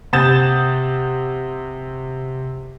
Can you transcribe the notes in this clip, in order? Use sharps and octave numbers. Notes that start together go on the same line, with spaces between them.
C3 F#5 D#6 G6 A6 E7